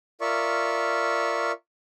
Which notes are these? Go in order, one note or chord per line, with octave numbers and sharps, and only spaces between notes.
F4 A#4 D5 E5 C#6